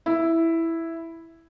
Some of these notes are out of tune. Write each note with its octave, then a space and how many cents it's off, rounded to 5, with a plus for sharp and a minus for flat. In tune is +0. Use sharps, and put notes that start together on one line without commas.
E4 +0